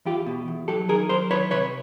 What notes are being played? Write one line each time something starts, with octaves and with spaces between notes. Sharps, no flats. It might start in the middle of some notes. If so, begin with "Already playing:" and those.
E2 F4 G4
B2
E2
F#3 G4 A4
D#3 G#4 A#4
F#3 A#4 C5
D#3 B4 C#5
C3 B4 C#5